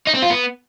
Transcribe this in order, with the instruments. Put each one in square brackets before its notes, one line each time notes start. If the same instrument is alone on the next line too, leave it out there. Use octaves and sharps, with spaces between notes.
[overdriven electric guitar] D#4
C4
F4
B3